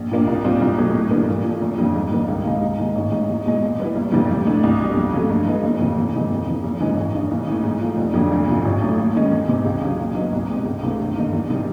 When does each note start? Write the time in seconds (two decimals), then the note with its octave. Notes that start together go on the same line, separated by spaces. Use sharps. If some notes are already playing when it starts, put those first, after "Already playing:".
Already playing: A#1
0.11 A#2 F3 A#3 D4
0.27 C2
0.44 A#2 G3 C4 F4
0.61 C2
0.77 B2 F#3 A3
0.94 A2
1.11 E3 G3 A#3
1.28 A#2
1.45 F3 A3
1.61 F#1
1.78 F2 D3 G3
1.95 G#2
2.12 D#3 G3 A#3
2.28 C#2
2.45 C3 D#3 G#3
2.61 G#2
2.78 D#3 G#3
2.96 A1
3.11 G#2 E3 G#3
3.29 E2
3.46 B2 G#3
3.62 A#2
3.80 G3 B3 E4
3.96 F#1
4.12 F2 C3 E3 G3
4.29 A2
4.47 E3 A3 D4
4.63 C2
4.80 B2 G3
4.97 F2
5.13 C#3 F#3 A3
5.30 G2
5.46 E3 G#3 B3
5.63 F#1
5.79 F2 C3 D#3
5.97 E2
6.14 C3 D#3 G#3 C4
6.31 F2
6.47 C3 E3
6.64 F#1
6.80 F#2 C#3 E3 G#3
6.97 A1
7.14 G2 D#3
7.31 B1
7.47 A2 E3
7.64 G#2
7.81 F3 A3
7.97 F1
8.14 F2 D3 F#3
8.32 D2
8.48 C3 F3
8.65 A1
8.82 A2 F#3 A3
8.98 D#2
9.15 D#3 G#3 C#4
9.32 E2
9.48 C3 E3 G#3 C4
9.65 C#2
9.82 C#3 F#3
9.99 A#2
10.15 F#3 B3 D#4
10.32 C2
10.49 B2 G#3 C4
10.66 C#2
10.83 C3 E3 A3
10.99 G1
11.16 G2 D#3
11.33 E2
11.50 C3 D#3 G3